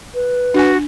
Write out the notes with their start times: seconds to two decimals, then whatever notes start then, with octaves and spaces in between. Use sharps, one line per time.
0.15 B4
0.54 D4 F#4 G#5